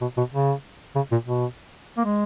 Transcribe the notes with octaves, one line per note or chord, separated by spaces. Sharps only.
B2
B2
C#3
C#3
A#2
B2
A#3
G#3